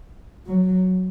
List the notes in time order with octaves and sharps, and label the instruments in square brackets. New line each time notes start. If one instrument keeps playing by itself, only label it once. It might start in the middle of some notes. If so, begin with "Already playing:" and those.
[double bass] F#3